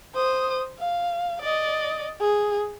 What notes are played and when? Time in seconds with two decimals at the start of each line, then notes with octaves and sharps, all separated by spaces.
0.15 C5 D#6
0.79 F5
1.41 D5 D#5
2.21 G#4